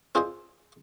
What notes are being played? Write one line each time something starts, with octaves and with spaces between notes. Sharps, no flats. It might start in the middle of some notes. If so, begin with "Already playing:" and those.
C4 F4 G#4 C5 D#5